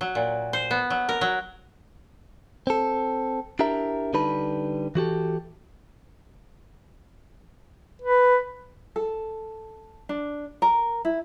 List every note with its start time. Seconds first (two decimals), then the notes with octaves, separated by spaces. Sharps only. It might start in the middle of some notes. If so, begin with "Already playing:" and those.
0.01 F#3
0.15 A#2
0.53 C5
0.71 B3
0.90 F#3
1.09 A#4
1.21 F#3
2.67 C4 A4
3.59 D4 E4 G4 A#4 E5 A#5
4.13 D3 G3 D#4 B4 A5 B5
4.95 E3 F#4 G4 A4
8.02 B4
8.96 A4
10.09 D4
10.62 A#4
11.05 E4